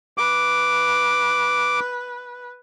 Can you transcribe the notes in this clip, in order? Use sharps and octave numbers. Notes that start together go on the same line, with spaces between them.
B4 D6